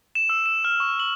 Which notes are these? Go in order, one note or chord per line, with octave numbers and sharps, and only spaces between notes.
E7
E6
E7
F6
C#6
F#7